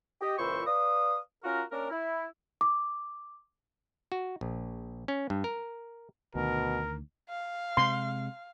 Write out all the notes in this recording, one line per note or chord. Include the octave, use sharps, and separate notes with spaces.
G4 D#5
C#2 A#2 E3 E4 C5 C#6
B4 D5 F5 D#6
C#4 F4 F#4 A#4
A#3 C#4 D4 A#4
E4
D6
F#4
A#1
C#4
G2
A#4
D2 B2 D#3 A#4
F5
C3 G#3 C6